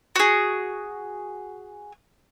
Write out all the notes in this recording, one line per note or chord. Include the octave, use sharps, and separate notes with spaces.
F#4 G#4